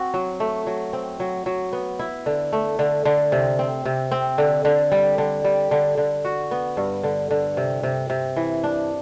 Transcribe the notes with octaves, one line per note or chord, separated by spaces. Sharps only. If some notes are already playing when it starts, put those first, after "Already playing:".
Already playing: C4 F#4
F#3
A3
F#3
C4
F#3
F#3
B3
E4
D3
A3
D3
D3
C3
C4
C3
C4
D3
D3
G3
D3
G3
D3
D3
F#4
B3
G2
D3
D3
C3
C3
C3
E3
D4